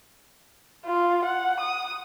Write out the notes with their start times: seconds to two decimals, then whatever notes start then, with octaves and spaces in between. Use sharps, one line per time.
0.86 F4
1.25 F#5
1.60 D#6